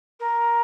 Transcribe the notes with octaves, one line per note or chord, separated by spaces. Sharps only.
A#4